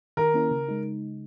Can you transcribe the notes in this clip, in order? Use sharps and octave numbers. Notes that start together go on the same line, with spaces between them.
D#3 A#4
A#3 C#4 E4
C#3
G#3 D#4